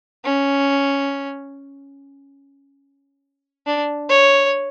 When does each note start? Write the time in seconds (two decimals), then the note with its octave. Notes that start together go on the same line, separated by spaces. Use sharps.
0.24 C#4
3.66 D4
4.09 C#5